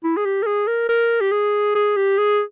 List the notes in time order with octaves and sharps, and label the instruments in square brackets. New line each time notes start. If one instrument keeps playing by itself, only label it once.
[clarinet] E4
G#4
G4
A#4
G#4
A#4
A#4
G4
G#4
G#4
G4
G#4